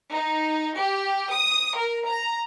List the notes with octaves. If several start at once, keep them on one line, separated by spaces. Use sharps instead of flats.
D#4
G4
D#6
A#4
A#5